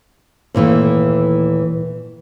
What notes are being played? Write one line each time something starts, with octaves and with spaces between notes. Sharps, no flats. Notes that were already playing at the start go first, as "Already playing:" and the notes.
D#2 A#2 E3 A3